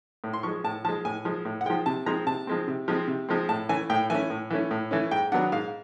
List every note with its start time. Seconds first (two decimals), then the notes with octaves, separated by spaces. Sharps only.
0.24 A2
0.33 C6
0.43 F3 G#3 C#6
0.64 A2 A5
0.84 F3 A5
0.89 G#3
1.05 A2 G#5
1.25 F3 G#3
1.45 A2
1.61 F#5
1.66 G#3 G5
1.70 F3
1.86 C3 A5
2.06 F3 G#3 C4 A#5
2.27 C3 A5
2.47 F3 G#3 C4
2.68 C3
2.88 F3 G#3 C4
3.08 C3
3.29 F3 G#3 C4
3.49 A2 A5
3.69 E3 A3 C#4 G#5
3.90 A2 G5
4.10 E3 A3 C#4 G#5
4.30 A2
4.50 E3 A3 C#4
4.71 A2
4.91 E3 A3 C#4
5.11 G#2 G5
5.32 D#3 F#3 B3 D4 F#5
5.52 G#2 F5